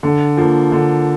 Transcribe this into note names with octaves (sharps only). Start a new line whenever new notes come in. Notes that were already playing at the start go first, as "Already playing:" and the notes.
D3
F3 A#3
D3